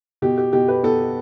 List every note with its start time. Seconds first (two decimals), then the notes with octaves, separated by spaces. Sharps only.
0.22 B2 G4
0.38 G4
0.53 B2 G4
0.68 B4
0.83 B3 A4